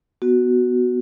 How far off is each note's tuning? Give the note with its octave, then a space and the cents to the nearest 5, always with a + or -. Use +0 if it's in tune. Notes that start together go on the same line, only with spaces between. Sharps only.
B3 +0 F#4 +0